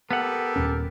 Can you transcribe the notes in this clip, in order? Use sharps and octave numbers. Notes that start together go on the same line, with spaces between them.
B3 G4 A4 A#4 F#5
D#1 C#4